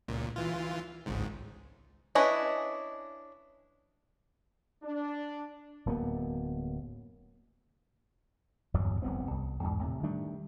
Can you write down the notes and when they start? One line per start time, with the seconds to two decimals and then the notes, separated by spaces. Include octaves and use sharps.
0.08 C#2 A#2
0.36 E3 F4
1.06 G#1 C#2 G#2
2.15 C#4 D4 E4 B4 D#5
4.83 D4
5.86 D1 F#2 A#3 B3
8.74 D1 E2 G2 F#3
9.02 F1 C2 B3 C4
9.31 C2
9.63 E2 G#2
9.83 A2 C3
10.03 D#3 G3 A3 D4